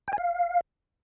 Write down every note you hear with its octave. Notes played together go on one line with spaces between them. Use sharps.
G5
G#5
F5